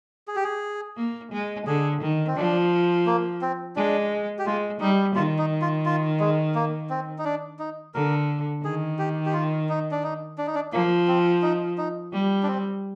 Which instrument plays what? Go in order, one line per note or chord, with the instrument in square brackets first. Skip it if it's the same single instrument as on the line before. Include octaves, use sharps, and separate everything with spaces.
[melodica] G#4
G4
G#4
[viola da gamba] A#3
G#3
[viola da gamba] D3 [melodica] G#4
[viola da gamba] D#3
[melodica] C4
[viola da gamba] F3 [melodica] D4
[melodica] A#3
C4
[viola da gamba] G#3 [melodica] D4
[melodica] G4
[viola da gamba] G#3 [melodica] F4
[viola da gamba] G3 [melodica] D#4
[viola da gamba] D#3 [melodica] F4
[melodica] D#4
F4
F4
G#3
A#3
C4
D#4
D4
D#4
[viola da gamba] D3 [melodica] A#4
[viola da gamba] D#3 [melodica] G#4
[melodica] G4
G4
F4
D#4
D4
D#4
D4
D#4
D4
[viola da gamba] F3 [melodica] A#3
[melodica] C4
D#4
D#4
[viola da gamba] G3
[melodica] D4
C4